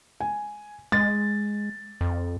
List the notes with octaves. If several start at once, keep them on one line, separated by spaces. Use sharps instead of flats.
G#5
G#3 A6
F2